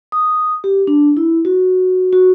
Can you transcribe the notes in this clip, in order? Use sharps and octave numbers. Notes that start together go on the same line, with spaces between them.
D#6
G4
D4
E4
F#4
F#4